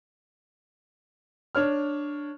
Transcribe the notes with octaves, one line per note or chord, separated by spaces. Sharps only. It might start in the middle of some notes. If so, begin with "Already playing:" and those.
D4 C#5 F6